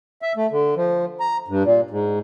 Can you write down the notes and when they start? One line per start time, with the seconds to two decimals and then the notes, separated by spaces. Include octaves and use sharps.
0.22 E5
0.36 A3
0.51 D3
0.76 F3
1.20 A#5
1.48 G2
1.63 A#2
1.91 G#2